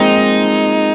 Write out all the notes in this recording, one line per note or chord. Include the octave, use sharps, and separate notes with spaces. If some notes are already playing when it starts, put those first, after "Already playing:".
Already playing: F3 G#3 A#3 C4 D#4